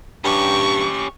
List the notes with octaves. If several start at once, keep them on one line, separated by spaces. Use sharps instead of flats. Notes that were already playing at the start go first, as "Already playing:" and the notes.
G2 C#4 G4 C#6